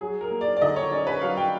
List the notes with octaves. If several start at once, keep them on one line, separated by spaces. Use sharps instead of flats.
F#3 G#4
A#4
A#3
D5
D5
D3 D#5
C#5
C#4 D5
B4
F#3 F5
G5